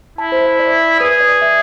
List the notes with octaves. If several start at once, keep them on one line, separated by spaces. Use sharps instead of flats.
E4 A5
C5
E5
D5
G#4 B4
D5
E5